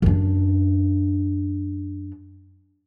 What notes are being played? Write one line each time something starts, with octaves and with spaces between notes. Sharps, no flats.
F#2 D4